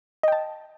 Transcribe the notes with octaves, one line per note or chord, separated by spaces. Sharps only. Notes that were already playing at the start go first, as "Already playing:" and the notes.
D#5 G5 A5